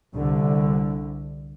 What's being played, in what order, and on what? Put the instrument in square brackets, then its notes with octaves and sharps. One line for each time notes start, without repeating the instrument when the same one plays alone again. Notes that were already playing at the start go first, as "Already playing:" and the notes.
[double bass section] C2 D3